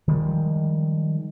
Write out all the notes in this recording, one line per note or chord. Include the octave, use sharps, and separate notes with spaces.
D#3 F3 G3 G#3